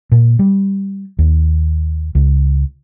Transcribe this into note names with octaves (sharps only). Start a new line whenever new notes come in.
A#2
G3
D#2
C#2